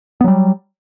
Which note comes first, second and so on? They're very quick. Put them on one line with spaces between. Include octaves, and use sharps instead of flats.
B3 F#3 G3